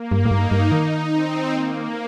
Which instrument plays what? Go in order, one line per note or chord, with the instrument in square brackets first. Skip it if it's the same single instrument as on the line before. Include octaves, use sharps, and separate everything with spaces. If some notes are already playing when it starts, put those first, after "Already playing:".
Already playing: [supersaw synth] A#3
[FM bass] G2
A2
[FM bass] G2 [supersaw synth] D#4
[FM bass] G2
[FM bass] D#3 [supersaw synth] D#4
[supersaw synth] C4
A#3